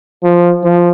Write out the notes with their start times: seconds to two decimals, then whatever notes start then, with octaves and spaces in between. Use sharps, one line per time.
0.23 F3
0.64 F3